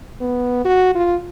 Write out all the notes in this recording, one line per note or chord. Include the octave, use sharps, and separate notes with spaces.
B3
F#4
F4